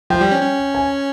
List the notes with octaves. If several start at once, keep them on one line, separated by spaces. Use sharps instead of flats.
F3 G5
G3
C#4
C#4
G#5